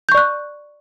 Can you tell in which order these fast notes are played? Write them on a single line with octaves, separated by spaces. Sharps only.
G6 C#6 D5 F#6